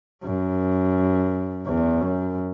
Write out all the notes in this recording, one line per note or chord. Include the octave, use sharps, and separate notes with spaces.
F#2
E2
F#2